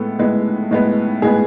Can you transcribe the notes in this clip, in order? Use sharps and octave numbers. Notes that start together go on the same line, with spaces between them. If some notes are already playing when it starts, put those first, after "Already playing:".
Already playing: A2 G#3 B3 A4
A2 G#3 B3
A2 G#3 B3
A2 G#3 B3 G#4